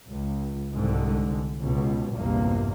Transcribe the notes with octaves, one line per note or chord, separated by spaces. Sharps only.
C#2
C2 G#2 D3
C#2 B2
A#1 E2 G2 C3 A#3